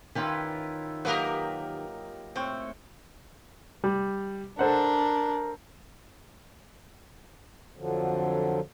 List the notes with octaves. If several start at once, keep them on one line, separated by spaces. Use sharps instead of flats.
D#3 C#4 E4 F4 G4 B4
F#3 A#3 D#4 G4 A#4 B4 D#5
A2 C4 G5 C#6
G3
D4 A4 A#4 C5 F#5
F2 D3 F3 F#3